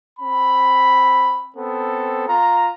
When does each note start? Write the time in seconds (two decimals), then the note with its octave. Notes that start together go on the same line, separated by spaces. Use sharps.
0.20 C4 B5
1.56 B3 C4 A4
2.27 F4 A#5